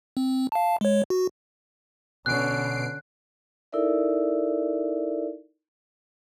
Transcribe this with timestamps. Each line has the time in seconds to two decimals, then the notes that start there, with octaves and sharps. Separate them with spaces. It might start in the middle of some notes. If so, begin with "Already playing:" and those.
0.17 C4
0.52 F5 A5
0.81 G#3 C#5
1.10 F#4
2.26 B2 D3 C#4 F#6 C7 D7
3.72 D#4 E4 A4 A#4 D5 E5